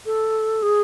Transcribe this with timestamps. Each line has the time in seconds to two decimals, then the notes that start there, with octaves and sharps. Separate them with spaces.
0.06 A4
0.62 G#4